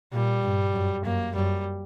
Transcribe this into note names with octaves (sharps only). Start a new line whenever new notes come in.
A#2 G3
G2
F#2
F#2 A#3
F#2 G3